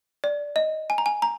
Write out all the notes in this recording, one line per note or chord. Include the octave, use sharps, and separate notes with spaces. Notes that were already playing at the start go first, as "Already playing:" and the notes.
D5
D#5
G#5
A#5
G#5
A#5